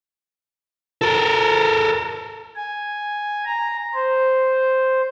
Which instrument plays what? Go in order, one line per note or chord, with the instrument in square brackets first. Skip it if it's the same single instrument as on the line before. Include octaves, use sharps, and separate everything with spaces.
[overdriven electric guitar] A4 A#4
[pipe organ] G#5
A#5
C5